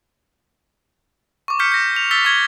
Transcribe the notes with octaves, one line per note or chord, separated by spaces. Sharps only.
C#6 D6
F6 G6 B6 C#7
G6 A#6
F7
E6 A6 B6 G7
C#6 G#6 G7